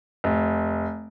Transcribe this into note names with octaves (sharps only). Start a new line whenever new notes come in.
F1